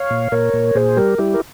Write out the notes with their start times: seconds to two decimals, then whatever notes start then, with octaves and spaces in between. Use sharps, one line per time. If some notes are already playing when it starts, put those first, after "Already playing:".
Already playing: C#5 F5
0.10 A#2
0.32 A#2 A#4 C#5
0.54 A#2
0.75 A#2 G#4 C5
0.97 G3 G4 A#4
1.18 G3 E4 G4
1.34 A#4